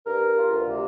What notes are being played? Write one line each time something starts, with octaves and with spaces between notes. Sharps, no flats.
G2 A#4
G2
F4
D2
C3